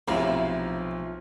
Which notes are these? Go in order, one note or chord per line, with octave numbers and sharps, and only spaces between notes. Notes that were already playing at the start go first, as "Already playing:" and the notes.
B1 A2 C3 F3 E4 F5 A#5 F6